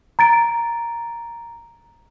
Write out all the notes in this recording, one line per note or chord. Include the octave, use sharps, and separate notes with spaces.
A#5 A6 D7